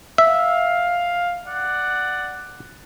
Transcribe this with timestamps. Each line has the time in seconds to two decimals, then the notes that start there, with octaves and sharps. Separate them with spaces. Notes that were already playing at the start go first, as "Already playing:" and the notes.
0.18 E5 F5
1.48 D5 F#5